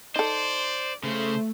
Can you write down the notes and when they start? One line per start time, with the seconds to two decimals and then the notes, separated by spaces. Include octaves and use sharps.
0.16 D#4 A4 C5 D5
1.04 C#3 A3 C5